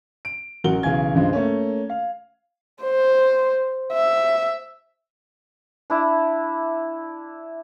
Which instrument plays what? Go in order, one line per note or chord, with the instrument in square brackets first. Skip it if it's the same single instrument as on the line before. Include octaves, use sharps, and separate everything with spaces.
[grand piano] D7
A1 F#3 A#4 F#5 G7
B1 C#3 E3 F5 G#5 G#6
C#2 G2 F3 G#3
A3 A#3 C#4
F5
[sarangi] C5
E5
[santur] D4 E4